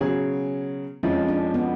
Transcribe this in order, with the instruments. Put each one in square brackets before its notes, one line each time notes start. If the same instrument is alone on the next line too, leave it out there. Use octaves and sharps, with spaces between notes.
[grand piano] C#3 F#3 C#4 G#4 [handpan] B3
[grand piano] F2 F3 G#3 [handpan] C#4
[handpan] D4
B3